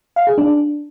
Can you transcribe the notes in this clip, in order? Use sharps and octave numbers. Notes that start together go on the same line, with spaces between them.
F5
G#4
D4